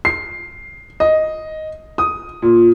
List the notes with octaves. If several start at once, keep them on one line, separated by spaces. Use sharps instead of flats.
C7
D#5
D#6
A#2